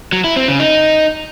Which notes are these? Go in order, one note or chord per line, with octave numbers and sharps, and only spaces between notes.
F#3
E4
C4
C#3
D#4